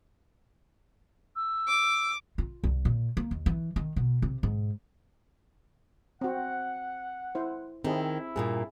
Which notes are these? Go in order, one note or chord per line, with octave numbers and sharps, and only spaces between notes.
E6
D6
F4
C2
A#2
A#3
D#2
E3
D#3
B2
C3
G#2
C4 F#4 F#5
E4 C5
D#3 C4 E4 G#4
G2 A#2 A#3 G#4